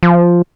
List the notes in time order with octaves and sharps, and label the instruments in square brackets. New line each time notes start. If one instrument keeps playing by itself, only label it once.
[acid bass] F3